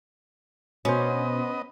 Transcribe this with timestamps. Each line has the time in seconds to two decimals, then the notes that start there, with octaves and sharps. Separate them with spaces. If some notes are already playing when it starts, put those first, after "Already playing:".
0.85 B2 B3 C#4 F#4 C5 D#5